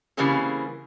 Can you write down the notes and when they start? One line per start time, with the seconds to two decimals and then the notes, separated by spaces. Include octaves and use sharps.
0.17 C#3 E3 G3 A#3 C4 G#4